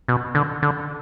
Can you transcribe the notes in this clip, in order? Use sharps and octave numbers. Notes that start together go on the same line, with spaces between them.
B2
D3
D3